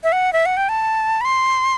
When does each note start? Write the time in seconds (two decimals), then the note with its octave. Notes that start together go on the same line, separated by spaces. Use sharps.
0.04 E5
0.12 F#5
0.33 E5
0.46 F#5
0.57 G5
0.69 A5
1.21 B5
1.25 C6